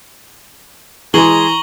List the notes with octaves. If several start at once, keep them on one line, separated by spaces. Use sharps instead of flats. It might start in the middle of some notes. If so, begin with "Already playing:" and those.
E3 G#3 G#4 A#5 C#6 F#7 G7